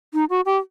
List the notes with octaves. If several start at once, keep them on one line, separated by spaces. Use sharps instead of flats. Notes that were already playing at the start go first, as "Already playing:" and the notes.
D#4
F#4
G4